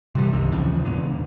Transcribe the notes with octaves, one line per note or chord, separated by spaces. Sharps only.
C3 E3 F#3 G3
C2 G2 C3 D#3
D#2 C#3 E3 F3
E2 G#2 B2 D3